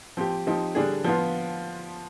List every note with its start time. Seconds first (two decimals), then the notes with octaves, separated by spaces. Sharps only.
0.17 F3 C4 G4
0.47 F3 C4 D#4 G4
0.75 D3 G3 D4 G#4
1.04 F3 B3 F4